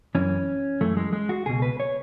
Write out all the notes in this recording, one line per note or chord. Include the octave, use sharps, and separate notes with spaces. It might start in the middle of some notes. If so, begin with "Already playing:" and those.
F#2 E3 C#4
F#2 E3 A3
G#3
G#3
F#4
C#2 B2 G#4
B4
C#5